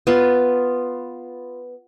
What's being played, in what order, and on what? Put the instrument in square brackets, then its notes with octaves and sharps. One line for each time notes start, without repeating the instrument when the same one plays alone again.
[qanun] B3 F4